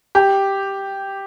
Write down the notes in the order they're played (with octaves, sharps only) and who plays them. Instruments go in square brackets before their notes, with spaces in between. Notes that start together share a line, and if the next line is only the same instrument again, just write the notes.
[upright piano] G4